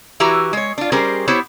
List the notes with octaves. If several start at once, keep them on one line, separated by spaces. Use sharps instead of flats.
E3 E4 F#4 G4 B4 A#5
G#3 C#5
D4 F4
G3 C#4 G4 G#4 A#4 C5
B3 E4 G4 C5 C#5